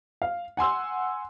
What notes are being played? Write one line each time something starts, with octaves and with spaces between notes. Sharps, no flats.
F5
F#5 G#5 C6 E6